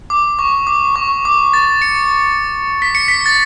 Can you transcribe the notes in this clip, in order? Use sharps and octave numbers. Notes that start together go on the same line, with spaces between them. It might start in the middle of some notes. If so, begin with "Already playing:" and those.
D6
C#6
D6
C#6
D6
A6
C#7
B6
C#7
B6
A6